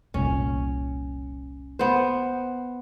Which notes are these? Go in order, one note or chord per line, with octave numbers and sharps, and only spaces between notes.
F1 C2 A#2 C#4
B3 C5